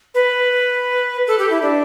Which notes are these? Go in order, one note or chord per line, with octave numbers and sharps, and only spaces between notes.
B4
A4
G4
E4
D4